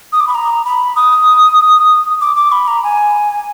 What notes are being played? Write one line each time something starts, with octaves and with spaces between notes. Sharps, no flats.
D#6
D6
B5
A#5
B5
D#6
D6
D6
B5
A#5
G#5